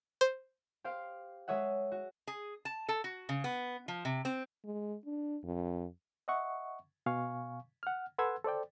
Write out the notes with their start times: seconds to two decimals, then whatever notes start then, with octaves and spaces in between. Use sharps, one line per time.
0.21 C5
0.84 G4 C5 F5 D7
1.48 G#3 G#4 C#5 E5 F#5
1.92 F#4
2.27 G#4
2.65 A5
2.89 A4
3.04 F#4
3.29 C#3
3.44 B3
3.88 F3
4.05 C3
4.25 C4
4.65 G#3
5.06 D4
5.44 F2
6.28 D#5 E5 F#5 C#6
7.06 B2 F5 G#5 C#6
7.83 F#5 F6
8.18 A4 B4 F#5 C6 E6 G#6
8.44 A4 C5 D5 G5